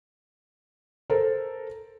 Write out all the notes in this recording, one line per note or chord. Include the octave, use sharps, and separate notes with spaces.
A4 A#4 C5